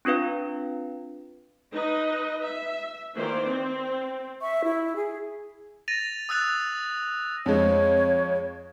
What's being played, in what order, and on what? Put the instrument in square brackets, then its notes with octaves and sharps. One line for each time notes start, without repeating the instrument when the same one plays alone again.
[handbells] C4 D4 F4 B4 F5
[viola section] D#4 B4 D#5
E5
D#3 E3 A#3 C5 D5
C4
[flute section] E5 C#6
E4
G#4
[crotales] A6 A#6 D#7 F7
D#6 E6 F#6 A6 F7
[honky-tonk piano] F2 G#3 [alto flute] C#5